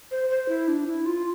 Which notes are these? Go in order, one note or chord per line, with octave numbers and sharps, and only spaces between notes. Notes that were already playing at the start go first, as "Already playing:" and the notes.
C5
C5
E4
D4
E4
F4